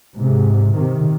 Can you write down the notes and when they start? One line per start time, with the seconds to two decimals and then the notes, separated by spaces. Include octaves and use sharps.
0.16 G#2 C3
0.75 C3 D#3